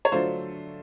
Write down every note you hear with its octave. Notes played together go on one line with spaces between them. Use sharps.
C#5
D3 F#3 A3 D4 F4 C5